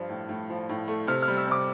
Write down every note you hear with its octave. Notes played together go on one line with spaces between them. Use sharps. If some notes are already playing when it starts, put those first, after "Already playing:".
Already playing: G2 F3
A2
A2
F3
A2
A3
C3 F6
F6
G3
E6
C3 D6